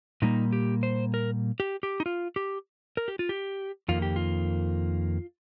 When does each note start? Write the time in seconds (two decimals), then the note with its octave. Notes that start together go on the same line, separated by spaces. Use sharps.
0.22 A#2 G3 A#3 D#4
0.53 G4
0.83 C5
1.14 A#4
1.60 G4
1.83 G4
2.00 D#4
2.06 F4
2.36 G4
2.97 A#4
3.08 G4
3.19 F4
3.29 G4
3.88 F2 D#3 A#3 F4
4.02 G4
4.16 F4